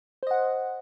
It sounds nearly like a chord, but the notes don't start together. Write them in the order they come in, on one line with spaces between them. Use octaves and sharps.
C5 D#5 F#5